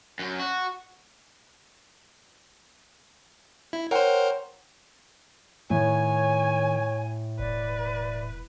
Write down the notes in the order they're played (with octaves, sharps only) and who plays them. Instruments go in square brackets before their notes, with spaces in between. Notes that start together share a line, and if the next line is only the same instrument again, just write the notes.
[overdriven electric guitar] F#2
F#4
[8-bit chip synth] E4
[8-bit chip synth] A#4 C5 [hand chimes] C#5 F#5 G5
[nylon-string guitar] A2 [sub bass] D#3 [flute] C#5 [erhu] G#5
[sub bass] E1 [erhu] B4 [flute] D5